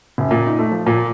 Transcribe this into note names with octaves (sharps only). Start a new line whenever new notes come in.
F#1
A#2
D#4
A3
F3
A#2